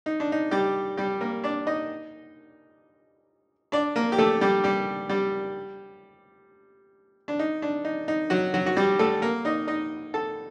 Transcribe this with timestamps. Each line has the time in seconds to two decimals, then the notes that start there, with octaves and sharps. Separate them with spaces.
0.06 D#4
0.20 D4
0.32 D#4
0.51 G3 G4
0.97 G3 G4
1.21 A#3 A#4
1.44 D4 D5
1.67 D#4 D#5
3.72 D4 D5
3.96 A#3 A#4
4.12 G4
4.18 A3 A4
4.41 G3 G4
4.64 G3 G4
5.09 G3 G4
7.28 D4
7.39 D#4
7.62 D4
7.85 D#4
8.08 D#4
8.30 F#3 F#4
8.54 F#3 F#4
8.66 F#4
8.76 G3 G4
8.99 A3 A4
9.22 A#3 A#4
9.45 D#4 D#5
9.68 D#4 D#5
10.14 A4 A5